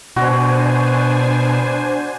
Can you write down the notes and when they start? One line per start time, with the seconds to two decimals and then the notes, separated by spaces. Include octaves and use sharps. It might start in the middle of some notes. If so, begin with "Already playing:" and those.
0.16 B2 D4 F#4 C5 G#5